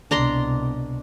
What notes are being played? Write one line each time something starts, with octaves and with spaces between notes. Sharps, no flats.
C2 B2 D4 A#5 C6